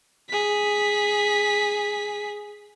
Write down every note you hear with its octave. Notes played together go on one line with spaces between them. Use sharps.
G#4 B6